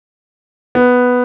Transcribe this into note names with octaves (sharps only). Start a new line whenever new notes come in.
B3